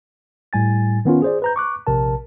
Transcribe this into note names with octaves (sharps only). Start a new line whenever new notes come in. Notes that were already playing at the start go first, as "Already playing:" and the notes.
A2 G3 G#5 A6
D#3 B3 C#4 F4
G#4 C5 D5
B4 A#5 G6
C#6 D6 F#6
A#1 C3 A#4 A5